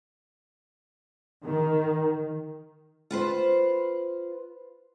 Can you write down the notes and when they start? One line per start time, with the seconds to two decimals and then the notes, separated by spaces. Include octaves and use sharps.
1.44 D#3
3.11 F4 B4 C5